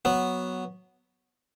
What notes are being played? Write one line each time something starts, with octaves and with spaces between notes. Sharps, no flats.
F#3 B3